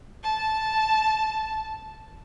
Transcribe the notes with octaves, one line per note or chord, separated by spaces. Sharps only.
A5